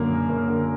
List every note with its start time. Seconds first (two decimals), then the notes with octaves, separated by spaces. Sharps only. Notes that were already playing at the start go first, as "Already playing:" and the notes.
Already playing: F#2 D3 A#3 A#4
0.09 F#1
0.29 F#1
0.48 D3